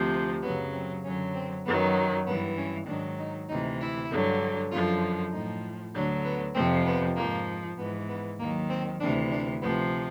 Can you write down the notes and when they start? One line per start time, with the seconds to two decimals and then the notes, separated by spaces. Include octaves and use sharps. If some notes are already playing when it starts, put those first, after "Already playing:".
Already playing: D2 C3 F3
0.42 F#2 C#3 F#3 B3
0.73 C4
1.04 F#2 D3 F#3 C#4
1.35 C4
1.65 F#2 D#3 F#3 B3
2.27 G2 E3 B3
2.56 C#4
2.87 G#2 D#3 F#3 D4
3.18 D#4
3.49 D2 C3 E3 D#4
3.80 E4
4.10 G2 D3 F#3
4.71 F#2 D3 F3 F4
5.32 A2 F3 D#4
5.94 D2 D3 F#3 D4
6.24 B3
6.55 F2 C3 F3 C4
6.86 B3
7.16 G#2 F3 A#3
7.77 G#2 E3 B3
8.08 B3
8.38 D#2 D#3 F#3 A#3
8.69 C4
9.00 D2 C3 E3 D4
9.30 D4
9.61 D2 C3 F3 B3